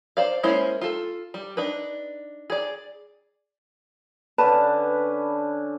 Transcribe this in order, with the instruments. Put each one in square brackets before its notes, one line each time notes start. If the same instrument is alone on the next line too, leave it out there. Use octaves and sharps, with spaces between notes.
[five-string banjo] C5 D5 F5
G#3 A#3 C#4 E4 C5
F4 A4
G3
D4 D#4 B4
G#4 D5
[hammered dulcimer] D3 C#4 D4 [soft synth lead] B4 [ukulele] A5